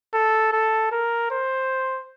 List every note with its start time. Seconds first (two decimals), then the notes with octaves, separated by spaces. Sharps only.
0.14 A4
0.53 A4
0.92 A#4
1.31 C5